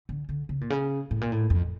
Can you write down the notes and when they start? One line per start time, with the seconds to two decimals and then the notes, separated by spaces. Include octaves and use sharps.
0.09 D3
0.29 D3
0.49 C#3
0.61 A#2
0.70 C#3
1.11 A2
1.21 A#2
1.32 A2
1.50 F2